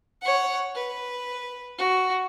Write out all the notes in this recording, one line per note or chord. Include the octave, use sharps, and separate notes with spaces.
C#5 F#5
B4
F#4